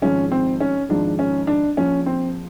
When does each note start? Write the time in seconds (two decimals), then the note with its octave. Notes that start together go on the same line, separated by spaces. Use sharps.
0.02 G#1 G#2 F3 C#4
0.32 C4
0.60 C#4
0.89 G#1 G#2 F3 D4
1.19 C#4
1.47 D4
1.77 A#1 A#2 F3 C#4
2.06 C4